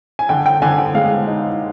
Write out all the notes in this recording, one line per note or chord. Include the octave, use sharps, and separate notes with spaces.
G#5
D3 G5
G5
D3 G#5
G5
G#3 F5
D#4